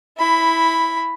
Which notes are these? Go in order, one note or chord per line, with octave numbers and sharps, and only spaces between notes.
E4 B5